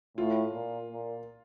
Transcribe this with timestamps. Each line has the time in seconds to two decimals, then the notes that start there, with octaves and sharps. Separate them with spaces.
0.17 A2 F4
0.53 A#2
0.90 A#2